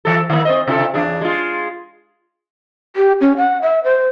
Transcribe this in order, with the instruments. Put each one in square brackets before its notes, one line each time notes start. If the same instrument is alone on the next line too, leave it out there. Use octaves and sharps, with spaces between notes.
[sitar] E3 A4
D#3 A#3
C4 C5 D#5
C3 F4 A4
E2 D4 G#4
G#3 F4
[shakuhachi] G4
C#4
F#5
E5
C5